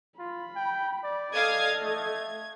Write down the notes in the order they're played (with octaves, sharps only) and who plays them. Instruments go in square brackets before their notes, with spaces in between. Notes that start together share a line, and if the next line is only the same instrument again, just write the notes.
[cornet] F4 [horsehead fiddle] B5
[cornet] G5
D5
[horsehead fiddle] A4 D#5 [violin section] F5 D#6 G#6
[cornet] A3 [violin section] G#6